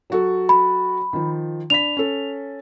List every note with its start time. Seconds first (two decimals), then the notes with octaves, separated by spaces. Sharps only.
0.10 F#3 F#4 A4
0.49 B5
1.13 D#3 F3
1.70 D4 B5 B6 F7
1.97 C#4 A4